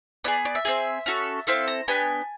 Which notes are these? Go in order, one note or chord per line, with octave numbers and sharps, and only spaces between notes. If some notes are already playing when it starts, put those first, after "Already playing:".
B3 E4 G#4 D5
D5
E5
C4 D#4 G#4
C#4 F#4 A4
C4 E4 A4 F5
A#5
B3 D4 G4 G#5